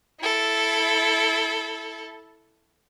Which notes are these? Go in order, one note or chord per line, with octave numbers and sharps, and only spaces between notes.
E4 A4